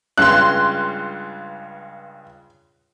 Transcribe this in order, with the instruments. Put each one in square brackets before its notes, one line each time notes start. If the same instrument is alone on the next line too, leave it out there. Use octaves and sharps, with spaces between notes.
[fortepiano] C#2 G2 C#3 [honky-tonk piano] C6 F#6